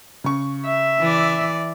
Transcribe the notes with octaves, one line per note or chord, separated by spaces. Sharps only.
C#3 C#6
E5
E3 D5